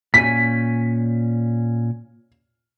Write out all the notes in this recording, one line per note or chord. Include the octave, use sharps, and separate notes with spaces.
A#2 C#4 G#5 B6